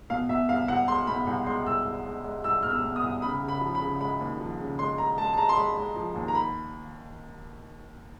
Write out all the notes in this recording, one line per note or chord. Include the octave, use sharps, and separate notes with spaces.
B2 F5
B2 E5
C2 F5
C2 F#5
G#3 C6
B2 B5
C2
G#3 C6
C2 E6
C2
G#3
G#3
C2 E6
B2 F6
E6
B2
D#6
C2
C#3 B5
C#3
B5
F3
B5
C#3
G#3 B5
D#2
F3
C#3
G#3 C6
G#3 A#5
G#3 A5
A5
G#3 A#5
C6
G#3 B5
G#3
F3
D#2
A#5
B5